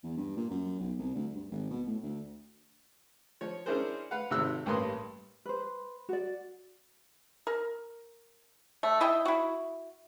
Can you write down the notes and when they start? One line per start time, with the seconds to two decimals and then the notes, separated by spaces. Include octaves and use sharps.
0.03 E2
0.17 G2
0.37 A#2
0.50 F#2
0.79 B1
0.99 C2
1.15 D2
1.35 G2
1.51 G#1
1.71 B2
1.87 A2
2.02 D2
3.41 F3 C#5
3.66 C#4 D4 E4 G#4 A#4 C5
4.11 B4 F5 F#5
4.31 G#1 C3 D#3 E6 F#6
4.66 A1 G2 A#3 B4 C6 D#6
5.46 B4 C5
6.09 F#4 D5
7.47 A#4
8.83 A3
9.00 E4 D#5 E5 G5
9.25 E4 F#4